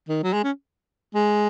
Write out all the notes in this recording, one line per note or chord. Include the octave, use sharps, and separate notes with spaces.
D#3
F#3
G#3
C#4
G#3